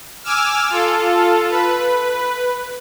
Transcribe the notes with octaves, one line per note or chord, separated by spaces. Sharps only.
G#5 D6 E6 F6
F4 A4
B4